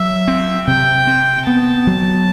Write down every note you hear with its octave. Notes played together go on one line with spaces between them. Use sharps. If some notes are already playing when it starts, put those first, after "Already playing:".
Already playing: F#3 E5
C4
C3 G5
C4
B3 A5
F#3